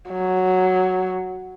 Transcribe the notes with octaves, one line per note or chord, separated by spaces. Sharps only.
F#3